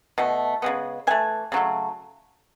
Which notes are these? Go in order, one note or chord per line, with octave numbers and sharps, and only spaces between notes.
B2 A3
C#3 G#3 B3
E3 A3 G#5
C#3 F#3 A3